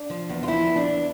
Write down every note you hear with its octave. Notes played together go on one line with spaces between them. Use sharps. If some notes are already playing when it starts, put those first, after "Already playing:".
Already playing: D4
F3
E2
F4
F3 E4
E2
D4
E2